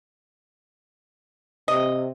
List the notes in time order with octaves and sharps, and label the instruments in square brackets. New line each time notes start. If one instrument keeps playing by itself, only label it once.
[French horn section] C3 [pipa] D#5